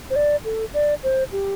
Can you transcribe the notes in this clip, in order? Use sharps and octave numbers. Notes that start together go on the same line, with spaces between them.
C5
D5
A4
D5
C5
G4